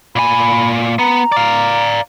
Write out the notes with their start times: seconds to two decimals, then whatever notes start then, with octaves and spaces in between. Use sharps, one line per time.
0.16 A#2 G#5 B5
0.99 B3 A#5
1.32 D5 F5